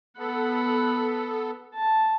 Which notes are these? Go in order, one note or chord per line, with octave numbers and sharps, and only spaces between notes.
B3 A4 F#5 B5
A5